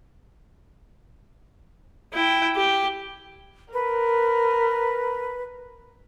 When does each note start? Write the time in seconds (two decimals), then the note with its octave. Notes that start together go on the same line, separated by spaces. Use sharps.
2.13 E4 G5
2.56 G4
3.73 A#4 B4